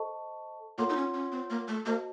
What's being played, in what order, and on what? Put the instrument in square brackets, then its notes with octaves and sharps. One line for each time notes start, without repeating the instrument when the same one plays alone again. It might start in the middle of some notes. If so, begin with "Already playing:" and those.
Already playing: [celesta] A4 C5 D#5 A5 C#6
[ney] A#3 [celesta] F4 A4 C#5 F#5 C6
[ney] D#4
C#4
C#4
C4
A#3
A3
[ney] A#3 [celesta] F#4 C5 D#5 A5